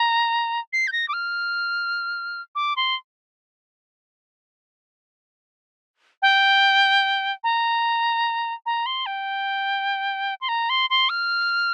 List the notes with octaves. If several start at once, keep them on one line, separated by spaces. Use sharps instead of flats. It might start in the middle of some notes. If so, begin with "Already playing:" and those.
Already playing: A#5
C7
G6
A#6
D6
F6
D6
C6
G5
A#5
A#5
C6
G5
C6
A#5
C6
C6
F6